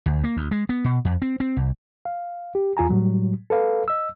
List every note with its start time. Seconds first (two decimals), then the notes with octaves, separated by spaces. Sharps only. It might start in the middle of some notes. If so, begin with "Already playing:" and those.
0.06 D2
0.24 A#3
0.37 D2
0.51 G#3
0.69 B3
0.84 B2
1.05 F2
1.22 C4
1.40 C4
1.57 C2
2.05 F5
2.55 G4
2.77 E2 F4 G#5 A#5
2.89 A2 F#3 G3
3.50 A4 B4 F5
3.88 D#5 E6